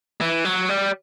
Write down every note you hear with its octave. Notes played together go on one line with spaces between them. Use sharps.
E3
F#3
G3